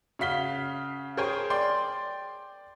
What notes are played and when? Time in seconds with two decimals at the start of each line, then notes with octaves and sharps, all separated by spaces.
0.19 C#3 F#4 F5 B6 G7
1.17 G#4 A#4 C5 C#5 G5 G#5
1.50 D5 G5 C6